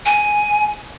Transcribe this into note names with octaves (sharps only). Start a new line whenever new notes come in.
G#5